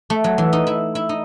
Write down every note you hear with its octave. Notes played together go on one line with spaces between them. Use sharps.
A3
F#3
E3
D#4
E4
E4
D#4